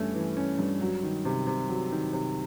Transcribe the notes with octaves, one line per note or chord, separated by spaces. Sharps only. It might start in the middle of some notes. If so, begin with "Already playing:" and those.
Already playing: G2 E3 A3 C#4
E3
C#4
G2
F#3
D#3
C3
C3
F#3
D#3
C3